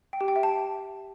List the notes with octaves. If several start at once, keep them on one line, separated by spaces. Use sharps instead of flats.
G5
G4
G5
E5
A5